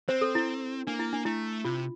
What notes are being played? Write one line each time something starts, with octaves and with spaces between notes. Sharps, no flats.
C4 C5
A4
E4
A#3 D4
E4
D4
A3 E4
C3 F4